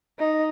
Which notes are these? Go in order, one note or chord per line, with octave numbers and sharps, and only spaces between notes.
D#4